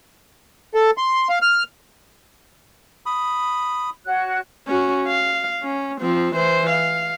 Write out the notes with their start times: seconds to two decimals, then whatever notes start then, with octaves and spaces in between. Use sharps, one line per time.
0.75 A4
0.98 C6
1.29 F5
1.42 F6
3.06 B5 D#6
4.05 F#4 C#5 F#6
4.68 C#4 F#4
5.08 F5
5.63 C#4
6.01 F3 C4
6.35 E3 C5
6.70 F5